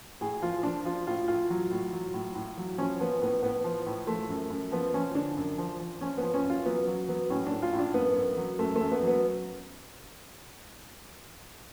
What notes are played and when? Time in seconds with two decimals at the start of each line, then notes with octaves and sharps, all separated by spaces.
0.21 A2 G#4
0.42 F3 F4
0.63 F3 D4
0.85 F3 F4
1.07 A2 F4
1.28 A2 F4
1.50 F#3
1.71 A2
1.93 F#3
2.14 A2
2.35 A2
2.58 F#3
2.78 F3 C#4
3.00 F3 B3
3.22 A2 B3
3.43 A2 B3
3.64 F3
3.86 A2
4.07 F3 A3
4.29 F#2
4.50 F#2
4.72 F3 B3
4.94 F3 C#4
5.15 D3 D4
5.37 F#2
5.58 F3
5.80 F3
6.01 F3 C#4
6.17 F3 B3
6.34 C#4
6.44 F#2
6.50 F4
6.66 F#3 B3
6.87 F#3
7.08 F#3 B3
7.30 A2 C#4
7.47 D4
7.52 A2
7.62 F4
7.73 A2
7.79 D4
7.94 F#2 B3
8.16 F#2
8.37 F#3
8.59 F#2 A3
8.76 F#2 A3
8.92 B3
9.03 F#3 B3